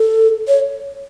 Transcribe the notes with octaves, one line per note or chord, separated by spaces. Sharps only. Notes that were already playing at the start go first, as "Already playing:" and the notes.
Already playing: A4
C#5